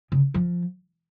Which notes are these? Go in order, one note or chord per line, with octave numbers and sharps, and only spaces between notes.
C#3
F3